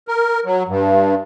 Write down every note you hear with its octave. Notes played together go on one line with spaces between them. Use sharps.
A#4
F#3
G2